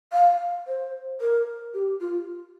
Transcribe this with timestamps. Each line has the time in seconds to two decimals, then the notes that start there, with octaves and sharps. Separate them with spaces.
0.13 F5
0.68 C5
1.21 A#4
1.74 G4
2.01 F4